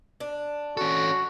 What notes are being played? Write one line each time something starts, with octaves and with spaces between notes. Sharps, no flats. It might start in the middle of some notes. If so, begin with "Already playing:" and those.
D4
C#4 F#4 A4